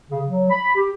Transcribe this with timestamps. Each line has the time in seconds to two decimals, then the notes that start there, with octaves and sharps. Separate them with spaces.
0.10 C#3
0.27 F#3
0.50 B5
0.76 G4